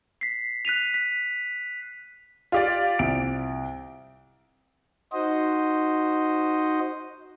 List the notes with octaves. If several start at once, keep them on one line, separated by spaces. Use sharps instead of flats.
B6 C7
F#6 B6 D#7 F7
B6
F4 G4 D5
C2 D7
D#4 F#4 C5 D#5